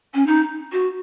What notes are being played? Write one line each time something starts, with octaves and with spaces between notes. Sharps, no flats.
C#4
D#4
F#4